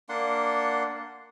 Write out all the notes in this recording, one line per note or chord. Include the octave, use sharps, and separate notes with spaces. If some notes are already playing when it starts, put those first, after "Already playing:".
A#3 D4 F#5 C6